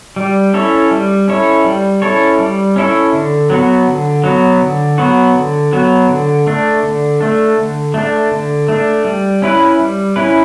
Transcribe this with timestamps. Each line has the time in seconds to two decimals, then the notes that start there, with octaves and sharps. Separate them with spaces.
0.16 G3
0.54 C#4 E4 A4 C#5
0.91 G3
1.28 C#4 E4 A4 C#5
1.64 G3
2.02 C#4 E4 A4 C#5
2.39 G3
2.76 C#4 E4 A4 C#5
3.13 D3
3.50 F#3 B3 F#4
3.88 D3
4.24 F#3 B3 F#4
4.62 D3
4.98 F#3 B3 F#4
5.35 D3
5.73 F#3 B3 F#4
6.09 D3
6.47 A3 D4
6.83 D3
7.21 A3 D4
7.57 D3
7.94 A3 D4
8.31 D3
8.68 A3 D4
9.05 G3
9.42 C#4 E4 B4
9.79 G3
10.16 C#4 E4 B4